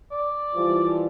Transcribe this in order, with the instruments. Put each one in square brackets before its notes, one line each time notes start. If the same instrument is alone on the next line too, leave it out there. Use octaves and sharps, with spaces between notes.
[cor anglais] D5
[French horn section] E3 F3 G3